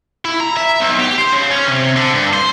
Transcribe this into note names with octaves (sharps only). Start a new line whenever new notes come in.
E4
A#5
E5
B1
G4
C5
C#3
C#4
C3
D3
G2
C5